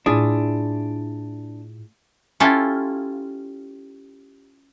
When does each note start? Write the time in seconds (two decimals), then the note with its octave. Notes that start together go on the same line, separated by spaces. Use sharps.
0.06 A2 D4 E4 F4 G#4
2.40 C#4 E4 F4 G4 A4